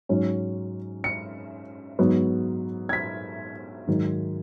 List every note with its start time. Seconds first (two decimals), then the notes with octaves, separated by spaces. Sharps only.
0.09 G#2 F#3 C#4
1.04 C#7
1.99 G#2 F#3 B3
2.89 G#6
2.93 B6
3.87 G#2 D#3 F#3